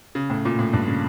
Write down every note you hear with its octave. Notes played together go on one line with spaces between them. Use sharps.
C#3
A2
A#2
A2
G2
C#3